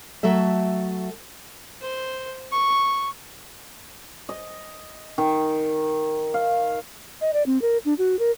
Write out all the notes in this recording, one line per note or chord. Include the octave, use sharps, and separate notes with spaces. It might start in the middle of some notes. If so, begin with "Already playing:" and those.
F#3 A3 A4 E5
C5
C#6
D#5
D#3
F5
D#5
D5
C4
A#4
D4
F#4
A#4